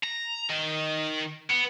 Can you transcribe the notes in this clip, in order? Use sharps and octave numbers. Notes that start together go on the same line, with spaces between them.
A#5
D#3 D#5
B3